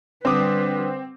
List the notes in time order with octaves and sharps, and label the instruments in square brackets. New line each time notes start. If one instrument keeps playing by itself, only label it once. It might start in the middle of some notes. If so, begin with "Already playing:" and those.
[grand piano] D3 D#6 [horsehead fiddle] G3 B4 [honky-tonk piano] C4 D6